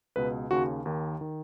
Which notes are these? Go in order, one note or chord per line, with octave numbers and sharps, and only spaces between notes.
C#2 B2 B4
D#2 C#3 F#4
D#2 D#3
D#3